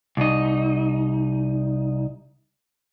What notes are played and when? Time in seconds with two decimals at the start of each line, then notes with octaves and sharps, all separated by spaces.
0.17 C2 D#4